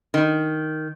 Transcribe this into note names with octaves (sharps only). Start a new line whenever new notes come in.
D#3